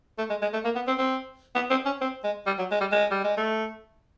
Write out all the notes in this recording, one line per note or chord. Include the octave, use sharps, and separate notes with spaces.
A3
G#3
G#3
A3
A#3
B3
C4
C4
B3
C4
C#4
C4
G#3
G3
F#3
G#3
G3
G#3
G3
G#3
A3